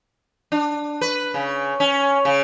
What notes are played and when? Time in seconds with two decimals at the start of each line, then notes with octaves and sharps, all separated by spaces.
0.52 D4
1.01 B4
1.34 C#3
1.80 C#4
2.25 C#3